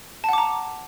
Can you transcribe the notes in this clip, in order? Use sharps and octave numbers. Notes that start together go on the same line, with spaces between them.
F#5 A5 A#5 D6